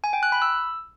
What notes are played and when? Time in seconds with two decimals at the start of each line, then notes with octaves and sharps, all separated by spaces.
0.04 G#5
0.13 G5
0.23 F#6
0.32 B5
0.42 E6